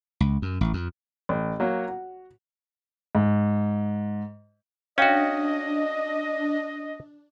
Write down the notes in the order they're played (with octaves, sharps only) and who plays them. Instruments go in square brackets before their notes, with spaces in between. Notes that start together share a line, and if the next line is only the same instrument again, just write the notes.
[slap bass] C#2
F#2
A1
F2
[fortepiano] A1
F#3 A#3 C#5
F#4
[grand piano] G#2
[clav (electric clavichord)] C#4 F#4 [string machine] D4 [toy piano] C#5 F5 G5 [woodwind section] D#5